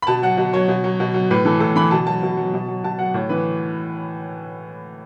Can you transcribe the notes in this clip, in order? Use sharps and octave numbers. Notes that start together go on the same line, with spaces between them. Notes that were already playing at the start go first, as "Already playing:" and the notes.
B5
B2 A5
F#3 F#5
B2
F#3 C#5
B2
F#3
B2
F#3
A2 B4
E3 A4
A2 A4
E3 B5
B2 A5
F#3 A5
B2
F#3
B2
F#3
B2 A5
F#3 F#5
A2 C#5
E3 B4